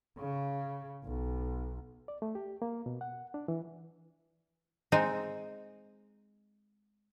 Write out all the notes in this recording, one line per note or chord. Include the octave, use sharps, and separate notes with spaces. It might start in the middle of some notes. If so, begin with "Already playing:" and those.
C#3
B1
D5
A3
G4
A#3
B2
F#5
D4
E3
G#3 C4 D#4 G#5